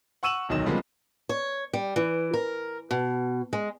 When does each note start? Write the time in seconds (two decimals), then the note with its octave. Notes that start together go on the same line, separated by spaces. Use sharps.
0.23 F#5 C#6 E6 D#7 E7 F#7
0.49 D1 B1 D#3 F#3 D#5 E7
0.66 C#3 F3 G3 G#3 A#3 B3
1.29 C#5
1.73 G3
1.96 E3
2.34 A#4
2.91 B2
3.53 G#3